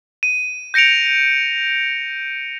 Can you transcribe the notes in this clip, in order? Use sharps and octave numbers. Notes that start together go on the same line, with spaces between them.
D#7
G6 A#6 C#7 D7 F7